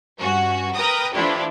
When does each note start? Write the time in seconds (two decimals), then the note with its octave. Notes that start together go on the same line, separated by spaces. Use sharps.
0.19 G2 C#4 F#4
0.73 A#4 B4 G5 A#5 D#6
1.13 E3 F3 A3 D4 E4 G4